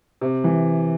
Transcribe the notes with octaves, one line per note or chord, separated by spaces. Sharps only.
C3
E3